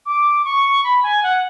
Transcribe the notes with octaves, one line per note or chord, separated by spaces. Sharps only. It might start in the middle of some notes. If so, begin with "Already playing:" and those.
D6
C#6
B5
G#5
F#5